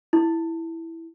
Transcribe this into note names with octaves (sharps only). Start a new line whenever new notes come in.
E4